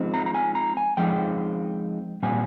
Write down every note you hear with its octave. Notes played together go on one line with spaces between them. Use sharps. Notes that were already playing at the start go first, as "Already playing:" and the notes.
Already playing: F3 G#3 C4 D#4
A#5
A#5
G#5
A#5
G#5
F3 G#3 C4 D#4 G5
A#2 G3 C4 G#5